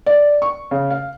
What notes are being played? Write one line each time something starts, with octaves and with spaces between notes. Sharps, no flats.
D5
C#6
C#3
F5